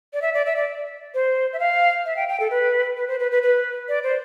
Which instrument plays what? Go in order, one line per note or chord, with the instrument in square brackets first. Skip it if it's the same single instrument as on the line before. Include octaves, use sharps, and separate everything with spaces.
[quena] D5
E5
D5
E5
D5
C5
E5
F5
E5
G5
G5
A4
B4
B4
C5
B4
B4
B4
D5
C5